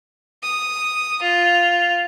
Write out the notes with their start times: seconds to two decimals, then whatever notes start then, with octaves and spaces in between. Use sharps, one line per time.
0.43 D#6
1.22 F4